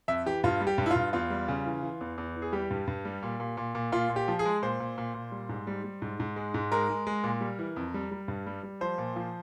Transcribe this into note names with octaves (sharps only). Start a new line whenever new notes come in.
F2 E5
E3 G4
G2 F4
G3
G4
G2
E4
F4
G2
E2 F4
G3
C#3
E3
E3
E2
E2
E3
G#4
G3 G4
G2
G2
G3
A#2
A#2
A#2
A#2
A#2 F4
A#2
G4
F3
G#4
G#3
A#2 C5
A#2
A#2
A#2
G3
G#2
G3
G3
G#2
G#2
G#3
G#2
G#3 A#4
G#3
G#3
A#2
G3
E3
F2
G3
G3
G2
G3
G3
F3 C5
A#2
F3